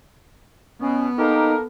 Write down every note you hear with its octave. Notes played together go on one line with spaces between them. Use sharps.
B2 B3 C#4
A#3 D#4 G4 A4 A#4